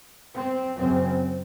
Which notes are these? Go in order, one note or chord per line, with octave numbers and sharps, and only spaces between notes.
C4
F#2 C#3 C4